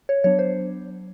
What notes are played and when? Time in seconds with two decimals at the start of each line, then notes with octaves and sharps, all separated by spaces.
0.09 C#5
0.24 F#3 B3 D4 C#5
0.39 C5